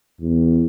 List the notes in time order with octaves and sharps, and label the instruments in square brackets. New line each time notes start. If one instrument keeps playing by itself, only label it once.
[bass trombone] E2